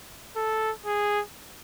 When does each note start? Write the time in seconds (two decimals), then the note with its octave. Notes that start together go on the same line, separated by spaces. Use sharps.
0.36 A4
0.86 G#4